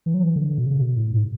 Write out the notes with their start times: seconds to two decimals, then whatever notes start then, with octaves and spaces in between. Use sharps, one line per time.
0.06 E3
0.14 F#3
0.23 E3
0.36 D3
0.58 B2
0.66 C#3
0.81 B2
0.97 A2
1.11 G#2